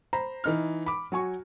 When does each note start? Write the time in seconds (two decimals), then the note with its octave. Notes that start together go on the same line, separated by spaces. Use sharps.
0.13 C5 A#5 B5
0.44 E3 D#4 F6
0.86 B5 D6
1.12 F#3 F#4 G#5 C#6